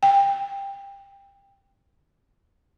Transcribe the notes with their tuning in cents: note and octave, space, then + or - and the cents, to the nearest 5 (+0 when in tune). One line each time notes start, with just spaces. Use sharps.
G5 +20